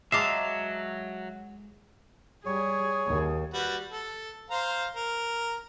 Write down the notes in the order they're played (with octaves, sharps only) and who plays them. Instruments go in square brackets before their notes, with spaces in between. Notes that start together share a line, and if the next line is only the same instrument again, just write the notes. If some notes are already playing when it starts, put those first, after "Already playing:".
[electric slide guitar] F#3 [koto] G#3 F5 A5 [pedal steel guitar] E5 A#5 [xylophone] D6 C7
[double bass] G3 [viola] G#4 [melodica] C#5
[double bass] D#2
[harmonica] G3 F#4 B4
A4
C5 F5 A#5
A#4